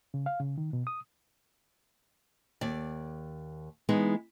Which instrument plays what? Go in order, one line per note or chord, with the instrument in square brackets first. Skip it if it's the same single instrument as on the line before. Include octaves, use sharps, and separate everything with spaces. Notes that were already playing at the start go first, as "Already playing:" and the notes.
[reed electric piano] C#3
F5
C#3
D#3
B2
D#6
[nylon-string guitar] D#2 D5
E3 G#3 B3 D#4